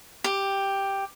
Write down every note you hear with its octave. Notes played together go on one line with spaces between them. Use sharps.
G4